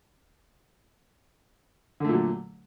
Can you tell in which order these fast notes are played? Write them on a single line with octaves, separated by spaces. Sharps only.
D3 A3 A#2 F#3